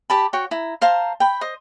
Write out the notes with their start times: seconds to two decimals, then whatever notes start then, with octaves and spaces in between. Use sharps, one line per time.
0.10 G4 A5 B5
0.33 F#4 C#5 G5
0.51 E4 A#5
0.82 C5 F5 A5 A#5
1.20 G5 B5
1.41 C5 D#5